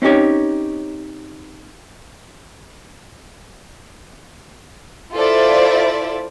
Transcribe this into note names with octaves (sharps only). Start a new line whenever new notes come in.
C4 C#4 D#4 G4 C#5
E4 F4 A4 C5 D5 E5